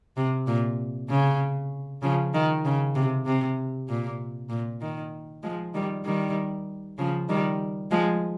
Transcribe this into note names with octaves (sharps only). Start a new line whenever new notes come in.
C3
A#2
C#3
C#3 F3
D#3
C#3
C3
C3
A#2
A#2
D#3
F3 G#3
D#3 G3
D#3 G3
C#3 F3
D#3 G3
F3 G#3